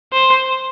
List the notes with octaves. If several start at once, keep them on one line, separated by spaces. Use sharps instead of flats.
C5